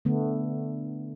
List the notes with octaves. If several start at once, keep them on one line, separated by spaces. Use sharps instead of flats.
D3 A3 B3